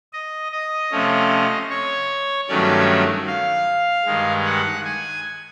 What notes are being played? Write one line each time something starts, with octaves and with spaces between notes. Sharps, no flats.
D#5
D#5
C3 F3 A3 C#4
C#5
G2 D#3 F#3 A3 C#4 D5
F5
G2 D#3 G#3
F#5
G#5